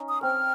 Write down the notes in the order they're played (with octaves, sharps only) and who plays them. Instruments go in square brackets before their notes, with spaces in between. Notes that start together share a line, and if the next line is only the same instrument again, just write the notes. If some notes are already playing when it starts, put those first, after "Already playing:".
Already playing: [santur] C#4 D#4
[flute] D#6
[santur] C4 [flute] F6